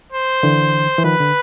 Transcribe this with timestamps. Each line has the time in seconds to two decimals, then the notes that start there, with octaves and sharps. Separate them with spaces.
0.12 C5
0.43 D3 E3
0.98 E3
1.04 D#3 F3 B4
1.20 D3